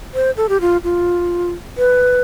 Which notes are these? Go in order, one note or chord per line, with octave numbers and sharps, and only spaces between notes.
C5
A4
G4
F4
F4
B4